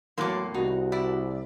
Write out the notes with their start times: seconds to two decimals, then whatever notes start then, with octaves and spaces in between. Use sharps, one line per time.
0.18 E2 A2 F#3 A#3 C6 D6
0.54 C2 D#4 F#4
0.92 E4 D5